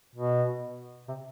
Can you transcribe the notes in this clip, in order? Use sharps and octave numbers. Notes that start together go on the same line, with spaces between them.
B2
C3